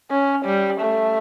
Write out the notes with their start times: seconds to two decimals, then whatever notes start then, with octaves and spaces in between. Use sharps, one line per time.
0.11 C#4
0.45 G3
0.80 A3